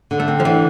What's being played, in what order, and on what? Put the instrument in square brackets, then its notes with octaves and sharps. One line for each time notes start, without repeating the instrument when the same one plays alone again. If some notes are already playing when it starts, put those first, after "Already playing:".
[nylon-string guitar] D3
[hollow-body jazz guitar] A3
[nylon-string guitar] C4
[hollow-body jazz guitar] F3
[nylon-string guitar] D3 [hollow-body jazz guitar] E3